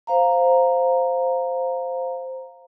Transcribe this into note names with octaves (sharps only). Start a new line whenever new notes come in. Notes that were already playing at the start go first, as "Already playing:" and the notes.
C5 F5 A#5